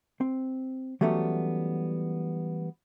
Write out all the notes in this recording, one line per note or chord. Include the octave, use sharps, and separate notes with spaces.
C4
E3 F#3 G3 A3 B3 C#4